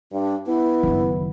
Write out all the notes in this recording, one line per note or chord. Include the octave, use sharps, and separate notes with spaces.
G2 D4
B3 E4
F#1 D#3